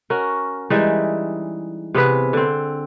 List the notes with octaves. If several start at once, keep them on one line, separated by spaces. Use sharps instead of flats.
C#4 F#4 A#4
E3 G3 G#3 D#4
C3 B3 G#4 B4
D3 C4